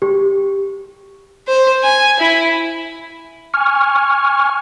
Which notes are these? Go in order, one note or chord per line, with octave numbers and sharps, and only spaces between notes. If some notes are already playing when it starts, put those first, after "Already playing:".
G4
C5
G#5
E4
G#5 C#6 F6